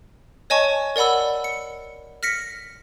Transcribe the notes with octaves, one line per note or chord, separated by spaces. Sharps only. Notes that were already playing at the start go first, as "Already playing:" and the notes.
C#5 D#5 G#5 A5 C#6
A#4 D5 F#5 B5 E6
C#7
F6 A#6 B6 C#7